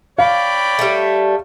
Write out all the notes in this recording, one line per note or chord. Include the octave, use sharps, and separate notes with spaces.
C#5 D5 F5 G5 B5
G3 A3